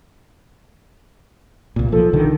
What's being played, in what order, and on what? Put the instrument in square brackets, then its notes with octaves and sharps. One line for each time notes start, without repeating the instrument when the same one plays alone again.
[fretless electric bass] C2 A#2
[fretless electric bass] B1 F3 [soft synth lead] A4
[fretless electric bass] B1 D3 D#3